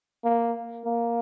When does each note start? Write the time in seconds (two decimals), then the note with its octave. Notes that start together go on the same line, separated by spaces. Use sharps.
0.24 A#3
0.86 A#3